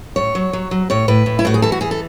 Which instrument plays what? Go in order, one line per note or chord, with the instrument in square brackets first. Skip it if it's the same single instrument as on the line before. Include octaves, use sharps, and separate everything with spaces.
[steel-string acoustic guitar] A2 C#5
F#3
F#3
F#3
A2 C#5
A2 B4
A2
E4
A2 F#4
G#4
E3 A4
F#4
E3 G#4
A4